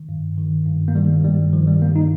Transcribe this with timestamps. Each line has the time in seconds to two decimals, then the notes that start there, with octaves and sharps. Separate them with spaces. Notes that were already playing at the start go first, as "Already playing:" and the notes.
Already playing: D#3
0.09 G2
0.38 D#3
0.66 G2
0.88 A#3
0.95 D#3 G3
1.24 G2 G3
1.53 D#3 F3
1.67 G3
1.82 G2 A#3
1.96 D#4